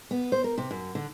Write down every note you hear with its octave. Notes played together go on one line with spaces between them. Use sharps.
B3
C5
A#4
C3
F#2
D3